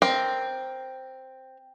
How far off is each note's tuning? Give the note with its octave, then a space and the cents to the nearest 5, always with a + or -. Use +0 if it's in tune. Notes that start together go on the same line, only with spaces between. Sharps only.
C4 +0 A#4 +15